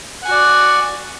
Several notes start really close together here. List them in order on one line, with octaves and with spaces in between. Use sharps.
F#5 G#5 F#4 D5